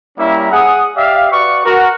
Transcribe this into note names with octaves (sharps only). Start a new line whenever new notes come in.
G3 A#3 C#4 E4 E5 A#5
G#4 F#5 D#6
G4 D5 E5 F5
F#4 B4 D5 C#6
F#4 A#4